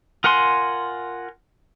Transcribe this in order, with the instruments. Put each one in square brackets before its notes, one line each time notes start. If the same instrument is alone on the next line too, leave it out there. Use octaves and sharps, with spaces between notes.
[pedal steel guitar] F4 A#4 F#5 G#5 C6